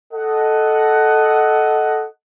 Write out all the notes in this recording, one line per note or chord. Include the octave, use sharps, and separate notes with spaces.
A4 D#5 F#5